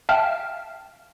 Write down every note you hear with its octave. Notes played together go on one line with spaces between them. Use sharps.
E5 F5 G5 A5 F6